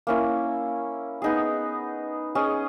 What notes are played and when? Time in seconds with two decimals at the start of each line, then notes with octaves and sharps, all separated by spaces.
0.07 A#3 C#4 E4
1.22 B3 D#4 G#4
2.35 C#4 G#4 D#5